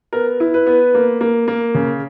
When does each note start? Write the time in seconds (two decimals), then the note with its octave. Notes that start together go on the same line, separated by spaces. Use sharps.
0.13 B3 A#4
0.40 E4
0.54 B4
0.66 B3
0.95 A#3
1.21 A#3
1.48 A#3
1.74 C#3